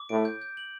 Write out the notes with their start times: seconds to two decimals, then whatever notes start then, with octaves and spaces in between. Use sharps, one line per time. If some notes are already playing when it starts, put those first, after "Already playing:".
Already playing: D6
0.09 A2 D7
0.25 G6
0.42 G6
0.57 F#7